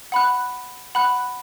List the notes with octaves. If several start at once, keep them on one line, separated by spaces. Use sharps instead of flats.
F#5 B5 F#6
F#5 B5 F#6